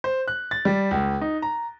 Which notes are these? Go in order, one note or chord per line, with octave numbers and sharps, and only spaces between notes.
C5
F#6
A6
G3
C#2
D#4
A#5